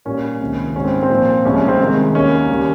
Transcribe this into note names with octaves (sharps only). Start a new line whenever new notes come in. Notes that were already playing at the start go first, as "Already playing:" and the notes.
A#2 G3 A#3 C#4
C#2 C3 D#3 A#3
G#2 G3 A#3 C#4
C4
C4
A#2 F3 A#3
C2 A#2 F3 G#3 C#4
C#4
C4
C2 C3 D#3 G#3
D#2 D#3 A#3 C#4
D#2 C#3 G3 A#3